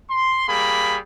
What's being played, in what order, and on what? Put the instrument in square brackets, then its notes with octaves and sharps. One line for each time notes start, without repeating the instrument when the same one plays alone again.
[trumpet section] C6
G3 A#3 G#4 B5